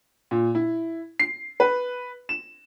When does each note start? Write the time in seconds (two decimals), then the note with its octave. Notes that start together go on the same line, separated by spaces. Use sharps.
0.31 A#2
0.55 E4
1.19 C7
1.60 B4
2.29 E7